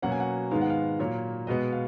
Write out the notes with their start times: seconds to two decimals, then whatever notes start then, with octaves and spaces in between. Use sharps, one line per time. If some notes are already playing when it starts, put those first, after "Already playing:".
0.02 B2 F#3 A#3 C#4 F#5
0.12 G#5
0.20 F#5
0.51 G#2 D#3 G#3 B3 D#4 F5
0.61 F#5
0.70 F5
0.99 A#2 F#3 A#3 C#5
1.47 B2 G#3 B3 D#5
1.72 F5